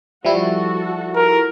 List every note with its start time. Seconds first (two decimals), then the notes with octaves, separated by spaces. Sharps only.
0.25 F3 G3 E4 F#4 A4
1.15 A#4